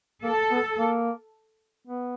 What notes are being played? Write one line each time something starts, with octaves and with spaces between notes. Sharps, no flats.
A#3 A4
B3
A#3
B3